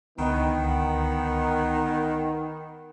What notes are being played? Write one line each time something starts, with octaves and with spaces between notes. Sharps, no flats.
C#2 D3 D#3 B3 D#5